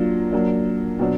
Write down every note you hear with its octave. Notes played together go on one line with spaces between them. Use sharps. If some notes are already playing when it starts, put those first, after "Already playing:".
Already playing: F#3 A#3 D4 F4
F#3 A#3 D4
B2 F#3 D4